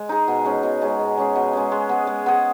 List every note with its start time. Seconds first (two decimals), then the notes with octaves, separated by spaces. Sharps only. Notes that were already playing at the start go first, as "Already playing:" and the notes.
Already playing: G#3
0.09 D#4 G#4
0.28 B2
0.45 G#3 C#4 G#4
0.63 B2
0.81 G#3 C#4 G#4
0.99 B2
1.17 G#3 C#4 G#4
1.35 B2
1.53 G#3 C#4 G#4
1.72 G#3
1.89 B3 G#4
2.07 G#3
2.26 B3 G#4